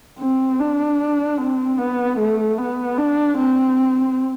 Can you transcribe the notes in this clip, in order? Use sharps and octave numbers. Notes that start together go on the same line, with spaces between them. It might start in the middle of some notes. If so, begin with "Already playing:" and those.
C4
D4
C4
B3
A3
B3
D4
C4